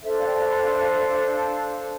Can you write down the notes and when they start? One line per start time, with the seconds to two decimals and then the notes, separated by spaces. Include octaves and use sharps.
0.03 D4 A4 C5 E5
0.18 D5 F5
0.28 G5
0.33 F5 A5
0.48 G5 B5
0.63 F5 A5
0.73 E5
0.79 D5 F5
0.94 E5
1.09 D5 F5
1.24 F5 A5